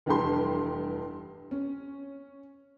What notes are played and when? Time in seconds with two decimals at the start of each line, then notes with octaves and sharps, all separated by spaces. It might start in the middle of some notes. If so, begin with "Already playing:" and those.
0.06 F1 E2 G2 G4 A4 C6
1.51 C#4